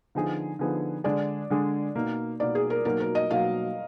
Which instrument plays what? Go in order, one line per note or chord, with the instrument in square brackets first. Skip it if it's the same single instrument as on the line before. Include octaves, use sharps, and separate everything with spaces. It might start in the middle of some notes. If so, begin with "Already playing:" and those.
[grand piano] D3 F3 B3 D#4 G#4
D3 F3 B3 D#4 G#4
[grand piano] D3 G#3 D4 G#4 [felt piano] D5
[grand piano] D3 G#3 D4 G#4
B2 A#3 D#4
[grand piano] B2 A#3 D#4 [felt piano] D5
[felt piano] G#4
A#4
[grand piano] B2 F#3 A#3 D#4 [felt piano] A#4
[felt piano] A#4
D#5
[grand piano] B2 F#3 A#3 D#4 [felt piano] F5